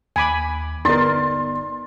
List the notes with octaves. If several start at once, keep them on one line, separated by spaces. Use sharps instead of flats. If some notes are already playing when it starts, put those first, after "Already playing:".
D#2 G#5 B5 D6
G1 B3 D#4 A#4 D5 C6 A6